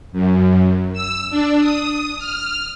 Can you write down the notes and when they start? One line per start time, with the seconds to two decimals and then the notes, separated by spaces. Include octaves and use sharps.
0.12 F#2
0.93 E6
1.30 D4
1.60 D#6
2.18 F6